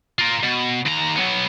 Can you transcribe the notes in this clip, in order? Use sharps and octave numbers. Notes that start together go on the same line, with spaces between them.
F4 A#4
B2
D#2 A#5
F#3 B3